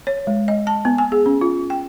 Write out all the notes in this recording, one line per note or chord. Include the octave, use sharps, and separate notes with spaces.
C#5
G#3
D#5
A5
B3
G#5
G#4
C#4
F4
G5